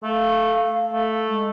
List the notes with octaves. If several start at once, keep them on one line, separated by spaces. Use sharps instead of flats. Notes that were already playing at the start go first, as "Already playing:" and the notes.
A3 F5
A3
G#3